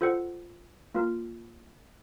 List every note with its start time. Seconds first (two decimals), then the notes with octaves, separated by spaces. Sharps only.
0.01 F4 A4 C5 F#5
0.94 A#3 F4 A#4